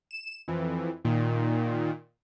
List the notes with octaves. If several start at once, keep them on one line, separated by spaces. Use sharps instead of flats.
E7
F2 E3
A#2 D#3